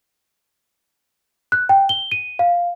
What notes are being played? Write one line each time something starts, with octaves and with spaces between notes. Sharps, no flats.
F#6
G5
G7
D#7
F5